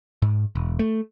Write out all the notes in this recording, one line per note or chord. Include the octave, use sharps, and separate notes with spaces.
G#2
E1
A3